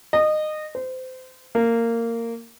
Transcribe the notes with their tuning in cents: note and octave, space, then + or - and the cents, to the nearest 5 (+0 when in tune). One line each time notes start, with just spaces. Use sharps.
D#5 -20
C5 -25
A#3 -15